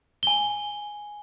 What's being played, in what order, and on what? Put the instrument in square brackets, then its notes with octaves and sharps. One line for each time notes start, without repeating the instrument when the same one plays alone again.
[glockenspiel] G#5 G7